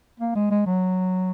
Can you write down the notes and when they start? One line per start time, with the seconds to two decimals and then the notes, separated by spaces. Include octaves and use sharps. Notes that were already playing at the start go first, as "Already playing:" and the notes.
0.20 A#3
0.35 G#3
0.51 G#3
0.66 F#3